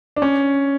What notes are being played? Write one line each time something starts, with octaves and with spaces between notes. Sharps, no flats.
D4
C#4